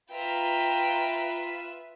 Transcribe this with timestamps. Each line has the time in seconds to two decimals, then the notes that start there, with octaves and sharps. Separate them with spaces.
0.12 F4 B4 E5 G5 A#5